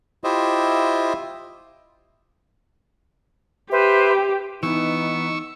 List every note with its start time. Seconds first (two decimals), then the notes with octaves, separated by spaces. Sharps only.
0.24 E4 F4 G4 C5 D#5 E5
3.71 G4 B4 C5 E5
4.63 E3 B3 D#4 C#6 E6